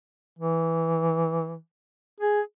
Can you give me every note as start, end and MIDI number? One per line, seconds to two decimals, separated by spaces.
0.38 1.57 52
2.20 2.41 68